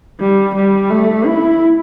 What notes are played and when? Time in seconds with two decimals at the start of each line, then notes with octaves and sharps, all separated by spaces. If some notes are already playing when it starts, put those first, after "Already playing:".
0.20 G3
0.55 G3
0.90 A3
1.26 E4